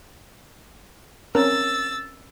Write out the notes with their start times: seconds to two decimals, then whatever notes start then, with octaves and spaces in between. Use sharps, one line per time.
1.35 C4 C#4 A#4 E6 A6